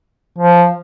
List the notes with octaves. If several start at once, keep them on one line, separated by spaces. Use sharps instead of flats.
F3